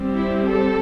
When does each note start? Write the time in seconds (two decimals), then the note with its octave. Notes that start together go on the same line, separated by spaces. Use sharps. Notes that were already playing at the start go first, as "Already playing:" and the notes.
Already playing: G3 C4
0.12 E4
0.44 A4